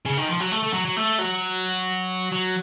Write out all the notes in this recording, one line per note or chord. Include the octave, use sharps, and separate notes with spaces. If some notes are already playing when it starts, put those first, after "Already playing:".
C#3
D#3
F3
F#3
A3
A3
F#3
F#3
A3
F#3
F#3